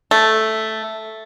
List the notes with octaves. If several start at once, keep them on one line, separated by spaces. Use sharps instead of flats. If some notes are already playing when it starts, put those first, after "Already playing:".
A3